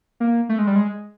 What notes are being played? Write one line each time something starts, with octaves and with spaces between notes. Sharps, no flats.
A#3
A3
G#3
G3
G#3